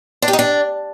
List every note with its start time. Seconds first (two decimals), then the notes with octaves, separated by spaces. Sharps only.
0.22 D4
0.28 G4
0.33 D#4
0.39 D4